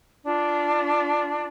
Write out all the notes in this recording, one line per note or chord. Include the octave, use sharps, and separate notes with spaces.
D4 F4